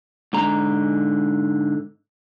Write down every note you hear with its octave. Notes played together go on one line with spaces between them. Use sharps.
G#2 D3 A#5